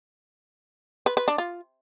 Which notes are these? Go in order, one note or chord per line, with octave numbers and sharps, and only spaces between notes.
B4
B4
D4
F4